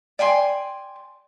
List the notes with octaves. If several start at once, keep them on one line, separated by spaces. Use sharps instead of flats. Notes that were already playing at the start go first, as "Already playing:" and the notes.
D5 G5 G#5 C6